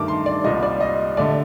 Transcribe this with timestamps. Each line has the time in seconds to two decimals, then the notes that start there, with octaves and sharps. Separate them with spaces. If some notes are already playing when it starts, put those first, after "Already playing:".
Already playing: G2 D#3 A3 D6
0.08 C6
0.26 D5
0.44 C2 A#2 G3 D#5
0.63 D5
0.81 D#5
1.17 A3 D5
1.20 D3